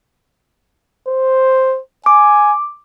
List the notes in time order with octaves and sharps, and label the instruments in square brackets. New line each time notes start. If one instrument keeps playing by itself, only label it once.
[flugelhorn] C5
[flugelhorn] G#5 [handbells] D6